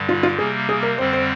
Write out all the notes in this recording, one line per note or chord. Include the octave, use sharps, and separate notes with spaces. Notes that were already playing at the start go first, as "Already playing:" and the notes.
Already playing: G2 D3 G3
F4
F4
C3 G3 A#3 G#4
G#4
A#4
F2 D3 G3 C4 C5
C5